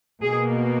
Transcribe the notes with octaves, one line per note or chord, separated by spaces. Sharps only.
B2 A#3 G#4